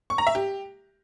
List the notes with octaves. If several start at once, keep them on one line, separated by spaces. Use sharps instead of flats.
C#6
A#5
E5
G4